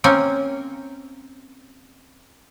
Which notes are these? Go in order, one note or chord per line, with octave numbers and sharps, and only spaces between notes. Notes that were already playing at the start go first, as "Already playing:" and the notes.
A#3 C4 C#4